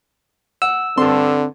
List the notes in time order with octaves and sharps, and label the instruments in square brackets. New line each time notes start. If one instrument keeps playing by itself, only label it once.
[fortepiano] F#5 [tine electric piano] E6
[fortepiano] G2 A4 C6 [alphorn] D3 [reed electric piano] C4